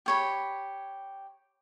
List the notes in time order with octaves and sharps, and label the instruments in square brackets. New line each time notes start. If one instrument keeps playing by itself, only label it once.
[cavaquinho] G4 C#5 B5